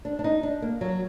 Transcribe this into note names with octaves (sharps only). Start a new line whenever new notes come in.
D4
D4
D#4
D4
A#3
F#3